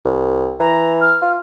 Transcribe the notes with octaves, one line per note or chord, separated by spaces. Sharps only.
C2
E3 A#5
F6
F4